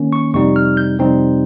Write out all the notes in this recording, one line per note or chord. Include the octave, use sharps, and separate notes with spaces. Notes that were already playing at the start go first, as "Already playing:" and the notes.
Already playing: D#3 A#3 C#4
C#6
F2 C3 G3 C4 D#4 C#6
F6
G6
F2 C3 G3 C4 D#4